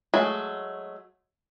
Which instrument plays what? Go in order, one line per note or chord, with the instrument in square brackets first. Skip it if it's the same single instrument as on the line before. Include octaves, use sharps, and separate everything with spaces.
[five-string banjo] F#3 G#3 A3